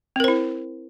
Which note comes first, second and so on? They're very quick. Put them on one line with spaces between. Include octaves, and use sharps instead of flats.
C4 A#4 C5 E4